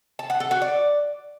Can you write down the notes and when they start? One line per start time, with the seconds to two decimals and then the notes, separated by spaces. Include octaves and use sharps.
0.19 A5
0.30 F#5
0.40 A4
0.51 F#4
0.62 D5